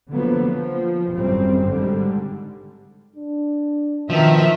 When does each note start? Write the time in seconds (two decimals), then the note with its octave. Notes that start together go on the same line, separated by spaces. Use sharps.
0.12 D3 F3 F#3 A#3 B3
0.45 F3
1.15 G#1 F#2 A2 G3 C4
1.68 G#2 D3 G3
3.16 D4
4.10 B2 D#3 F3 E5